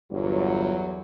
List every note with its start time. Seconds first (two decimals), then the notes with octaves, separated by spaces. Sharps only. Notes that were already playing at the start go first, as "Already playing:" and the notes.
0.11 G1 E2 F#3